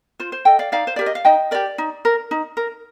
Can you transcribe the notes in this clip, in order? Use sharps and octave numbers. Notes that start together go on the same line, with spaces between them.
F4 C5
C5
A4 D#5 G5
D5 F5
D#4 D5 F5
C5
G4 A#4 D5
D#5
F5
D#4 D#5 G5
G4 A#4 D5
D#4
A#4
D#4
A#4